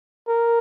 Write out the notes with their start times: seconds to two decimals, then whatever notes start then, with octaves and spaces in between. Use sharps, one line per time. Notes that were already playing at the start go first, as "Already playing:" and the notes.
0.28 A#4